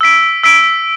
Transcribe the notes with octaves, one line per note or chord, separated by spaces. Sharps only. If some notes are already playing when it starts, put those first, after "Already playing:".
E6 B6 D7
E6 B6 D7